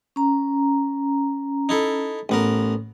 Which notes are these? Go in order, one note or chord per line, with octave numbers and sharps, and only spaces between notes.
C#4 A#5
D#4 E4 A4
A1 B3 A#4